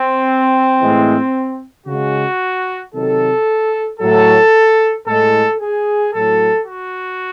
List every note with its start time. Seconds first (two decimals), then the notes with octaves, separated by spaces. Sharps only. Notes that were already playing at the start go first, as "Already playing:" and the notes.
Already playing: C4
0.79 A2 E3 G#3
1.86 C#3 G#3 F#4
2.93 C3 D#3 F#3 A4
3.99 A2 F#3 A4
5.06 A2 G#3 A4
5.59 G#4
6.13 A2 F#3 A4
6.66 F#4